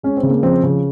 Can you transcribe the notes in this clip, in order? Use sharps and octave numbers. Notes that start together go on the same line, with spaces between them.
G#3 C#4
C4
C#3
A#3
F3 C4
C#3